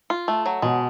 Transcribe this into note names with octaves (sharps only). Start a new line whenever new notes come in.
F4
A3
F#3
B2 G#3